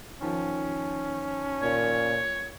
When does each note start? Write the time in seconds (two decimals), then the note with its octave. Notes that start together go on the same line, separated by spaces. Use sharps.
0.22 D#3 F3 C#4
1.62 A#2 C#5